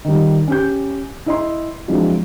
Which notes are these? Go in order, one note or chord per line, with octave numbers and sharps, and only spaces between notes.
D#3 G3
C#4 G4 G6
E4 D#5 C6
F3 F#3 G#3 C4 D4 E4